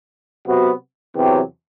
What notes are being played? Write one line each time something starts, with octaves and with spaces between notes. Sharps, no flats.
C3 F#3 B3 F#4
E2 C3 F#3 C4 G4